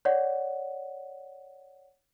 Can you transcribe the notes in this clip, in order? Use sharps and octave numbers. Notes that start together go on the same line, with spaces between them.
C#5 D5 F#5